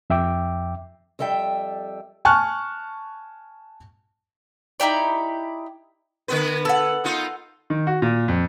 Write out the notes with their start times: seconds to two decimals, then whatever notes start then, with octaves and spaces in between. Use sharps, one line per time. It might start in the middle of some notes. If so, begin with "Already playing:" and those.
0.10 F2 E5 G5 D6
1.19 F2 G3 A4 E5 G5
2.25 G#5 A5 C#6 F6 F#6
4.80 D#4 E4 G4 D5
6.28 D3 B3 B4
6.65 A4 F#5
7.04 B3 D#4 F4
7.70 D#3
7.87 F#4
8.02 A#2
8.28 F2